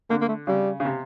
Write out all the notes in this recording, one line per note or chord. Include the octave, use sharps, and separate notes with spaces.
D3 A#3
A#3
A3
C#3 G3
C#3
C3